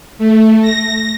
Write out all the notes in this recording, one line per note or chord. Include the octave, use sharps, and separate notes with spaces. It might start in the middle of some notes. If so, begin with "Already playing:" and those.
A3
A#6